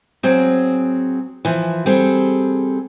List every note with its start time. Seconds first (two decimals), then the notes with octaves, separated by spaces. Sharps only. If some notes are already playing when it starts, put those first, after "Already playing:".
0.23 F#3 C4 G#4
1.45 E3 F3
1.86 G3 C4 G#4 A4